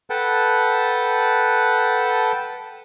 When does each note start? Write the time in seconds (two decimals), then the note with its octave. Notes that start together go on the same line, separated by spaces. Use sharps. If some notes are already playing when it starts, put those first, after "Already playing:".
0.10 A4 B4 F#5 G5 A5